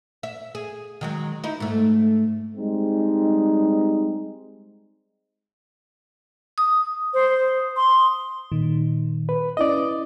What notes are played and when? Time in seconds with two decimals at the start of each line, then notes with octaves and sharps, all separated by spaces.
0.23 E5
0.55 G#4
1.01 D#3 F#3 G#3
1.44 D#4 E4
1.60 G#2 A3
2.56 G3 G#3 C4 D#4
6.58 D#6
7.14 C5
7.77 C6
8.52 A#2 D#3
9.29 B4
9.57 C#4 E4 B4 D5 D#5